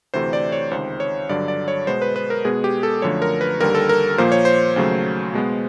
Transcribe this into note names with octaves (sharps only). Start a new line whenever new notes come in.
D2 C3 E3 A3 C5
D5
C#5
C#2 C3 D#3 C5
C#5
G2 D3 F#3 D5
D5
C#5
B2 G#3 B3 C5
B4
B4
A#4
B2 G#3 B3 G#4
G4
A4
F#2 D3 F3 A3 C#5
A#4
B4
D#2 D3 G3 A#4
A4
A#4
A#2 F3 A#3 C5
C#5
C5
D#2 C#3 F#3 A3
B2 G#3 B3